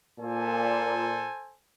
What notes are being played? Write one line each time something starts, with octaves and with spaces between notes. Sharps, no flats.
A#2 A4 C5 G#5